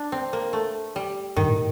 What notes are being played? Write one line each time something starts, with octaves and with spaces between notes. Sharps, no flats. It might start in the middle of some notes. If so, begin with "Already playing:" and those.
Already playing: D4
C4
A#3
A3
G3
G2 D#3
A2